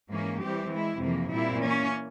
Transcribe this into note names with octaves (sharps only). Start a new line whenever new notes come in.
G#2 E3 A#3 C#4
E3 G3 C4 G4
E3 G#3 E4
F2 C3 E3 A#3
A#2 G3 C4 E4
E3 A#3 C#4